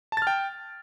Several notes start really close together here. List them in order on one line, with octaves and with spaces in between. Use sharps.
A5 A6 F6 G5